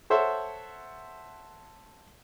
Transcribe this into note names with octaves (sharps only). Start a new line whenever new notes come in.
A4 C5 C#5 E5 F#5